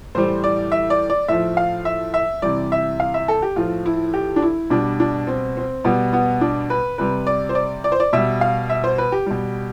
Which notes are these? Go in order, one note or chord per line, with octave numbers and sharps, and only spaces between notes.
A2 E3 G3 C5
D5
E5
D5
D5
A2 F3 E5
F5
E5
E5
C3 E3 G3 D5
E5
F5
E5
A4
G4
A2 F3 F4
E4
G4
D4
E4
B2 G3 D4
D4
C4
C4
B2 G3 B3
B3
D4
B4
C3 G3 B4
D5
C5
D5
D5
C5
D5
B2 G3 E5
F5
E5
C5
B4
G4
B2 G3